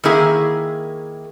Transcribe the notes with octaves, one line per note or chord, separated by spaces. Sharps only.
D#3 A#3 E4 G#4